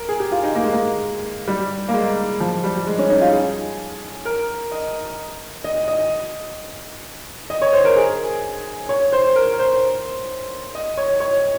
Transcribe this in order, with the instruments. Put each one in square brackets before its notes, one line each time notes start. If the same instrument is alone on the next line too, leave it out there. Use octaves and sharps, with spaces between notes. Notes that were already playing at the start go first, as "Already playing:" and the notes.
Already playing: [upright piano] A#4
G#4
G4
F4
D#4
A#3
G#3
A#3
G3
A#3
G#3
F3
G3
G#3
C#4
D#4
F4
G#4
A#4
D#5
D#5
D#5
D#5
C#5
C5
A#4
G#4
C#5
C5
A#4
C5
D#5
C#5
C#5